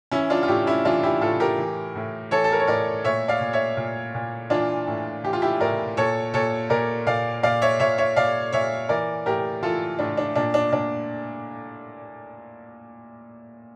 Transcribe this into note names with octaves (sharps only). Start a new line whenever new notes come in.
E3 C#4 E4
D4 F4
F4
A2 E4 G4
C#4 E4
E3 D4 F4
E4 G4
A2 F4 A4
G4 A#4
E3
A2
E3 A4 C#5
A4
A#4
C#5
A2 A#4 D5
A#2 C#5 E5
D5 F5
A#2
C#5 E5
A#2
A#2
E3 D4 F4
A2
E3 G4
F4
E4 G4
A2 A#4 D5
A#2 A4 C#5
A#2 A4 C#5
A#2 A#4 D5
A#2 D5 F5
A#2 D5 F5
C#5 E5
A#2 C#5 E5
C#5 E5
A#2 D5 F5
A#2 C#5 E5
E3 A#4 D5
A2 G4 A#4
E3 F4 A4
A2 D4
D4
A#2 D4
D4
A#2 D4